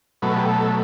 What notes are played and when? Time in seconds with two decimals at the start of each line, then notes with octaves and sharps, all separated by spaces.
0.22 B2 F#3 A3 B4
0.37 G4
0.47 A4